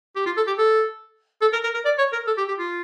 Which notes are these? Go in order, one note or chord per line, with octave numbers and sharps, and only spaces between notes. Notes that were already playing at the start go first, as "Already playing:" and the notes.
G4
F4
A4
G4
A4
A4
A#4
A#4
A#4
D5
C#5
A#4
A4
G4
G4
F4